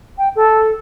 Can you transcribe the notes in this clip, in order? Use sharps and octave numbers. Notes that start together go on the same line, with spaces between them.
G5
A4